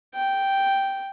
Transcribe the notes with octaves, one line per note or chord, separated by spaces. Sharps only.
G5